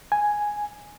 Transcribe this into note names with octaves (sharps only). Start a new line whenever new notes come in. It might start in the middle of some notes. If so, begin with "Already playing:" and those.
G#5